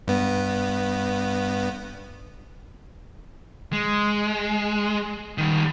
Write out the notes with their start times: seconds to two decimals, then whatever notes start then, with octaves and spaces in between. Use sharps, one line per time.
0.08 G2 B3
3.73 G#3
5.38 D#3 G3